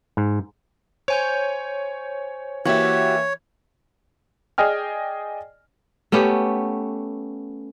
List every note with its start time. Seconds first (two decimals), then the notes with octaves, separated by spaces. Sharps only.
0.17 G#2
1.08 C5 C#5 G#5 G6
2.65 E3 A#3 F#4 G4 C#5 E5
4.58 G#4 D5 D#5 G5 G#5 F6
6.12 A3 B3 C#4 G4